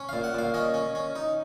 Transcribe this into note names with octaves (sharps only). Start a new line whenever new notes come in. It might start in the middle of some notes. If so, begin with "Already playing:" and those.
Already playing: C#4
A#2 F5
F#5
A#2 F5
C#4 D#5
C#4
C#4
D#4